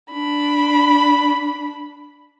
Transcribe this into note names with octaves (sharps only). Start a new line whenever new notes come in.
D4 B5